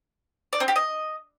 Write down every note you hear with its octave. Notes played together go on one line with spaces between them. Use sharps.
D5
C4
G4
D#5